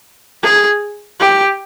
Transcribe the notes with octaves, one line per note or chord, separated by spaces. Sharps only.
G#4
G4